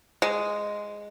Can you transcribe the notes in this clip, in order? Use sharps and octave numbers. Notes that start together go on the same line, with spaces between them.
G#3